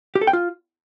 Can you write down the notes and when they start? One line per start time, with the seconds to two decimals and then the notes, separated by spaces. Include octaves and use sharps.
0.15 G4
0.21 A4
0.27 G5
0.33 F4